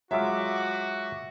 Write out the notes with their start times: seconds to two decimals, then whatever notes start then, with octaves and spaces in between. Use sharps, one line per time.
0.11 F#3 G#3 F4 F#4 E5 D6